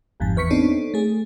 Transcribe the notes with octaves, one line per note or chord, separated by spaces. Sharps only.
G1 F2 G#2 A5
E2 B4 C#6 B6 C#7
B3 C4 D4 D#4 A4 C#5
A3 G#4